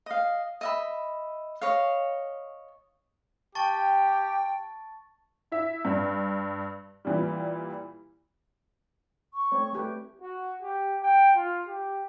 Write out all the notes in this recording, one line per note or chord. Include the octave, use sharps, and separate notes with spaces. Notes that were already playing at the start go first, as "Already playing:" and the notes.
D#5 F5
D#5 E5 B5
C#5 D#5 F5
G4 G5 A5 C#6 A6
E4 E5
G2
A#2 E3 G3
C#6
A3 C4 C#5
A3 G4 B4
F#4
G4
G5
F4
G4